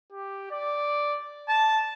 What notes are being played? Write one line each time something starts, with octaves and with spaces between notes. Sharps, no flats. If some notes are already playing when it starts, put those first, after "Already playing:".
G4
D5
A5